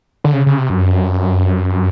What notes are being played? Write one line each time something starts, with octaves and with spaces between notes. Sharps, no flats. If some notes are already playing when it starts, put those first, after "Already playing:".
D3
C#3
C#3
C3
F#2